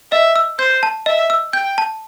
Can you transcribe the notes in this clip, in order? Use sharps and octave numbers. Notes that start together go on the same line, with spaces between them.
D#5 E5
E6
C5 G6
A5
D#5 E5
E6
G5 G6
A5